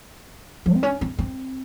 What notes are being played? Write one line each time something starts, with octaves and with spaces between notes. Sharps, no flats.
F3
C4
C#4
C4
C4